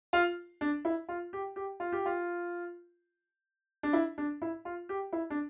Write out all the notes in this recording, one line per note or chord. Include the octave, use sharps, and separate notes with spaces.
F4
D4
E4
F4
G4
G4
F4
G4
F4
D4
E4
D4
E4
F4
G4
E4
D4